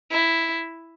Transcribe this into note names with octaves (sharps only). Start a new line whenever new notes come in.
E4